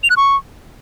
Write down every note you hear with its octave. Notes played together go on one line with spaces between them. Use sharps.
F7
F#6
C#6